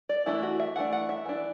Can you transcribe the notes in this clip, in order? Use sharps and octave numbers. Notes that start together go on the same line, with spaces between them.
D5
E3 A3 D4 E4
F#4
E5
E3 A3 D4 F#5
F#5
E5
E3 D4